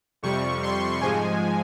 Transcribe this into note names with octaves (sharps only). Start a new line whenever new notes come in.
F2 C3 G3 C#6
C6
G#2 F3 G#3 G#5